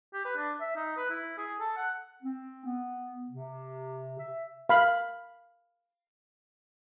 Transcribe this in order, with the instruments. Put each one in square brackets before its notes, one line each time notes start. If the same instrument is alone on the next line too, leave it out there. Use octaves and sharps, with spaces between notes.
[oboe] G4
B4
D4
E5
D#4
B4
E4
G#4
A4
F#5
[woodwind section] C4
B3
C3
E5
[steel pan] F5 B5